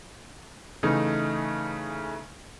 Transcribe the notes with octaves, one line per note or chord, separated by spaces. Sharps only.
C#3 E3 A3 D#4